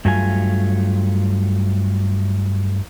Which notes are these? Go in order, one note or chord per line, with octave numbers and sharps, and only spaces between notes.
G2 F#3 A3 F4 G#5